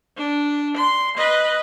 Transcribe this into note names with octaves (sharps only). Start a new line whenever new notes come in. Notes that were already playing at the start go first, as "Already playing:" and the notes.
D4
C6
B4 D#5